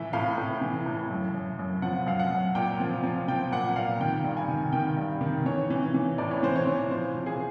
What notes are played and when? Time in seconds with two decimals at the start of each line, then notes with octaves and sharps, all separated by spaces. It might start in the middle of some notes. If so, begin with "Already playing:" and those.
Already playing: A2 E3 E5
0.13 A2 F5
0.38 A2
0.61 E3
0.86 A2
1.11 F#2
1.34 F#2
1.59 F#2
1.82 F3 F#5
2.07 F#2 F5
2.19 F#5
2.31 F#2
2.55 A#2 G5
2.80 F3
3.04 F3
3.28 F3 G5
3.52 A#2 F#5
3.76 A#2 F5
4.00 D#3 G5
4.24 G2
4.37 G#5
4.48 D#3
4.72 D#3 G5
4.97 G2
5.21 D#3
5.46 E3 C#5
5.70 E3
5.94 E3
6.18 A2 D5
6.31 C#5
6.43 E3 C5
6.56 C#5
6.67 E3
6.91 F3 C5
7.15 F3
7.26 G#4